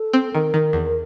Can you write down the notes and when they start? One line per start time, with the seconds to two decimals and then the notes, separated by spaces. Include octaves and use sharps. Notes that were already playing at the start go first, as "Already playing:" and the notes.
Already playing: A4
0.13 C4
0.33 D#3 A#4
0.54 D#3
0.73 E2